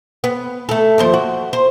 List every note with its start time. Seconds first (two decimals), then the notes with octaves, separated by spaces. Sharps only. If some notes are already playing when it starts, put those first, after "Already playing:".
0.24 B3
0.69 A3 A4
0.98 D#2 F3 C5
1.14 F#4
1.53 C5